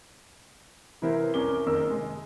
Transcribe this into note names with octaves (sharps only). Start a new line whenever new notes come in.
C3 E3 B3 E4 A#4 C5
C2 F2 C#4 A#4 D6 G7
F#1 F2 D#3 A#4 E6
C3 G#3